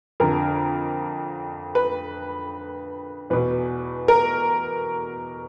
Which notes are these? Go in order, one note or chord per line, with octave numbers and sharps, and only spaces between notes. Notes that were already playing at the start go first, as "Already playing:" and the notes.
F2 D3 A#4
B4
E2 B2 B4
A#4